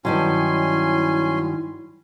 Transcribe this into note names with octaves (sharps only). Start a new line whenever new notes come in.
G2 D#3 F#3 C#4 E4 G#5 C6